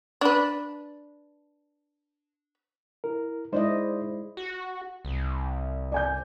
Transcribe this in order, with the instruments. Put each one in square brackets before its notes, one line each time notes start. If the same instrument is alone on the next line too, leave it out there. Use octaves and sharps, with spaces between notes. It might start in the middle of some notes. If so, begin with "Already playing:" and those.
[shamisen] D4 B4
[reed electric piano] E4 A#4
[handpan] G#3 E4 D#5 [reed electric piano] D#4 C5 D5
[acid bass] F#4
C2
[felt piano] D5 G#5 G6